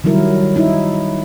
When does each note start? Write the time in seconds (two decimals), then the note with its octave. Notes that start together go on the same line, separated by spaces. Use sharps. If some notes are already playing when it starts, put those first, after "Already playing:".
0.04 D#3 F#3 G3 E4 A#4
0.56 D#4 E4